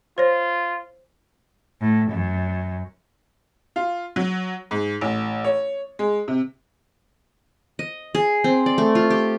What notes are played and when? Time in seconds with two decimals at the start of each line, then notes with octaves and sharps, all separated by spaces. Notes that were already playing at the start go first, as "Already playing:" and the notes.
0.18 F4 C5 C#5
1.81 A2
2.12 F#2
3.76 F4
4.16 F#3
4.71 G#2
5.01 A1
5.44 C#5
5.99 G#3
6.28 C3
7.79 D#5
8.15 G#4
8.44 C4
8.66 D5
8.78 A3
8.95 F4
9.10 G4